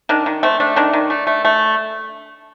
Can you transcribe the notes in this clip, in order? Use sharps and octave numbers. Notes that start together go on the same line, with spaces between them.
D#3 D4
D#3
A3 C4
A3 D4
D#3 D4
D#3
A3
A3
A3